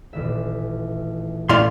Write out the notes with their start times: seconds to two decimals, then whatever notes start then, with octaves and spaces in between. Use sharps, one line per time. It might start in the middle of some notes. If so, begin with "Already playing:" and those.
0.13 D#1 A1 E5
1.49 A2 A3 C4 C#4 D5 F5 C6